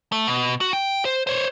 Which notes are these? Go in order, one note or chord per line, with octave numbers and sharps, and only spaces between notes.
A3
B2
F#4
G5
C5
C5 C#5